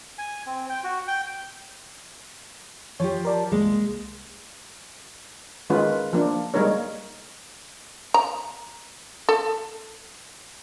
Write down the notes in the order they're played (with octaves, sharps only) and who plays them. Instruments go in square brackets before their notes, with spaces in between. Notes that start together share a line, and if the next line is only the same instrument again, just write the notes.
[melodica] G#5
C4
G5
F#4
G5
[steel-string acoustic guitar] F3 G4 [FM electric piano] C#5
[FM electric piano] A#4 D5 A5
[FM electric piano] C2 A#3 [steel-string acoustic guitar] G#3
[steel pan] D#3 G#3 C#4 F4 B4
F3 A#3 D4
G3 G#3 A#3 D#4 A#4 C#5
[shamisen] A#5
A4